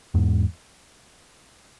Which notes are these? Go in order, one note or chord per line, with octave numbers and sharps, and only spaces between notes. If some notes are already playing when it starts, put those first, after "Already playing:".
E2 G#2